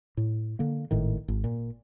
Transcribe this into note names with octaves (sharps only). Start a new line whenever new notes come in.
A2
D3 A#3
G#1 A2 D#3
G#1
A#2